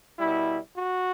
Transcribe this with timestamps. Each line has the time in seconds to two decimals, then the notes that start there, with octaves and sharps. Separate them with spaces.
0.19 B2 G3 E4
0.75 F#4